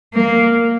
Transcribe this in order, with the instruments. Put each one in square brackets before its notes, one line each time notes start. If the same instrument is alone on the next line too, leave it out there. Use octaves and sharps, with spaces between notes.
[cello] A#3